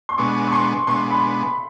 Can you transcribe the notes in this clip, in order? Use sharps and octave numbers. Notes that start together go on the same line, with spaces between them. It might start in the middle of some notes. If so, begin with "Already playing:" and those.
C6
B2 G#3 B3 D4 C#6
C#6
C6
B2 G#3 B3 D4 C6
B5